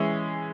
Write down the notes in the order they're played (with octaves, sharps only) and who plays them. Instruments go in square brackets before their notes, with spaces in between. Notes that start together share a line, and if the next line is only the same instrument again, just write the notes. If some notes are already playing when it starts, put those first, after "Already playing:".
Already playing: [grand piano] E3 G#3 C#4 E4